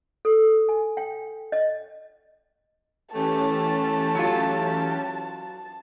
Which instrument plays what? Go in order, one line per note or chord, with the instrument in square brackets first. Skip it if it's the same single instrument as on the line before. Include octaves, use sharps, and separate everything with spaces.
[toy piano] A4
G#5
G5
D#5
[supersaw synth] E3 C#4 G4 [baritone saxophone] A3 [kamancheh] A5
[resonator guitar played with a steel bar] F#3 F4